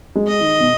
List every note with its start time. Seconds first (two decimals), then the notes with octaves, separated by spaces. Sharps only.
0.15 G#3
0.28 D#5
0.40 D#3
0.60 B2